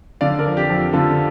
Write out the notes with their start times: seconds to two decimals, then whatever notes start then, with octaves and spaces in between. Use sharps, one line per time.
0.21 D3 D5 F5
0.39 A#4 D5
0.46 F2
0.57 G4
0.70 F2
0.93 D3 F4 A4